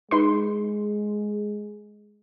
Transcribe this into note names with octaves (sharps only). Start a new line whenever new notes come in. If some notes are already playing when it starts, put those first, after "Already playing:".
G#3 D#4 B4 C6